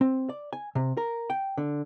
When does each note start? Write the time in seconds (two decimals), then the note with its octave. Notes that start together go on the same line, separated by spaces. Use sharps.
0.01 C4
0.29 D5
0.53 G#5
0.75 C3
0.97 A#4
1.30 G5
1.58 D3